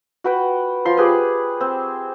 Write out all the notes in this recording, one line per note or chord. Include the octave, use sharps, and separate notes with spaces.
F#4 B4 G5
F3 C6
G4 G#4 B4
C4